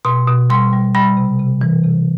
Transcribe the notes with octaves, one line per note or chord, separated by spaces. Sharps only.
B2 C6
B2
G3 C6
G3
G3 B5
C3
C3
E3
C3